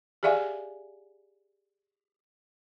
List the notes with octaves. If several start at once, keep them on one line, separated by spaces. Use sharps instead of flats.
G4 G#4 D5 E5 F5 G#5